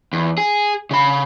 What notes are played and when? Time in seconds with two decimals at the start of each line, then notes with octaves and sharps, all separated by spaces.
0.13 E2
0.38 G#4
0.91 C#3 B5